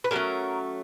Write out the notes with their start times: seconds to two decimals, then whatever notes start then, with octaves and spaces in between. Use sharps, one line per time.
0.04 B4
0.11 D3 F#3 A3 C#4 A#4